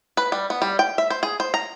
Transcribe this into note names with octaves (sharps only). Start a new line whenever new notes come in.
B4
G3
B3
G3
G5
E5
C5
G#4
C5
A#5